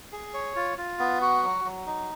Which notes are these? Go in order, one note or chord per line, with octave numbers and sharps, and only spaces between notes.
G#4
C#5
F4
F4
B3
F#4
F#3
F#3
D#4